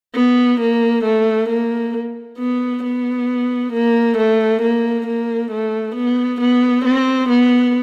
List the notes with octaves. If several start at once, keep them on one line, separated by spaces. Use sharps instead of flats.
B3
A#3
A3
A#3
B3
B3
A#3
A3
A#3
A#3
A3
B3
B3
C4
B3